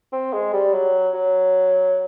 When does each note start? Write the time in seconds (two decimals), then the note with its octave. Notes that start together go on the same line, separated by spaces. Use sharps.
0.12 C4
0.33 G#3
0.54 G3
0.73 F#3
1.14 F#3